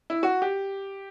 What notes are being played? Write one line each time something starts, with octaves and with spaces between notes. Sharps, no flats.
E4
F#4
G4